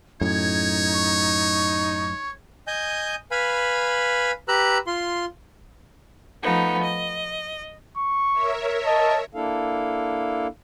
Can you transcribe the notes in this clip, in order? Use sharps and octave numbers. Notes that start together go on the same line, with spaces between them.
F#2 A2 D#4 C#5 G#6
C#6
D#5 G#5 D#6 G6
B4 F5 G#5 B5
G4 B4 A#5 E6 F#6
F4 C6
F3 A3 B3 D#4
D#5
C#6
A#4 C#5 E5
D#5 A5
A#3 D4 E4 A4 F5